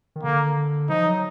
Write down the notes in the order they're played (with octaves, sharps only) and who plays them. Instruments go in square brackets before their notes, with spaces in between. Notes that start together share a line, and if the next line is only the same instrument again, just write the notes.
[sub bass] D#3
[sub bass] D3 [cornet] A#3
[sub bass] F3 [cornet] D#4
[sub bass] F#3